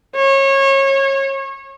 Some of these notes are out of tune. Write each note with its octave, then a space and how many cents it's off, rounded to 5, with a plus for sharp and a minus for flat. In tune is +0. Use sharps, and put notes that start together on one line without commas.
C#5 -25